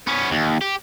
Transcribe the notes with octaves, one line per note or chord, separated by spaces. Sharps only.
B3 C#4
D#2
G4